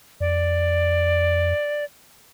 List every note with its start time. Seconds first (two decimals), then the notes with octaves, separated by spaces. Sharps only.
0.20 F2 D5